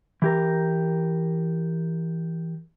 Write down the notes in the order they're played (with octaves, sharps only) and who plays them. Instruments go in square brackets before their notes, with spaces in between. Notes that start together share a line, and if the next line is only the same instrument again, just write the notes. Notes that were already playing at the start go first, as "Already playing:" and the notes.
[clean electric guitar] E3 G4 A#4